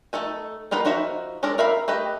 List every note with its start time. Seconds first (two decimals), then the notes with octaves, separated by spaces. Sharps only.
0.13 A3 D#4 A4 G#5
0.71 A#3 B3 D#4 F4 B4
0.85 F3 D#4 F#4 E5
1.43 G#3 D4 A4 A#4 D5
1.58 A#4 E5 F5 B5
1.88 A3 G4 B4 D#5